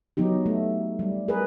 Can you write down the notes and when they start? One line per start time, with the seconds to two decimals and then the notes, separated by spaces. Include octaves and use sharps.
0.17 F#3 B3 D#4 G4
0.46 A3
0.99 G3
1.28 G#4 A#4 B4